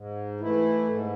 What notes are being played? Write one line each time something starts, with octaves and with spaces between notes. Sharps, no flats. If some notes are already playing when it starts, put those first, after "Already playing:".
Already playing: G#2
E3 A3 E4
G#2